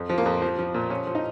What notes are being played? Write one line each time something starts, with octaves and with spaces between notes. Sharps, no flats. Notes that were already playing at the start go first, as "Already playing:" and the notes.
Already playing: F2
F3
A#3
F2
F3
F3
A#2
F3 C#4
F3
D#4